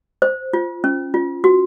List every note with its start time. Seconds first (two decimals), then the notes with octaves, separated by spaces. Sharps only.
0.22 C5
0.53 F4
0.84 C#4
1.14 F4
1.44 F#4